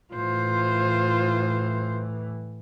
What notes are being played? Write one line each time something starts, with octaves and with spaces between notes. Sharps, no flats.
A2 E3 F4 C5